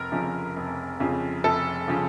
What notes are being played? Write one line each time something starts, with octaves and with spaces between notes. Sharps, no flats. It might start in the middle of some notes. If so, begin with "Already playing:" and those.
Already playing: F1 A#4
F2 C#3 F3
F1
F2 C#3 F3
F1 A4
C#3 F3